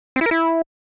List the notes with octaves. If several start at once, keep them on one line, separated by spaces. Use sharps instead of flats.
C4
E4
A#4
E4